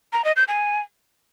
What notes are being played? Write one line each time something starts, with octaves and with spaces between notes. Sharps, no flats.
A#5
D#5
G6
G#5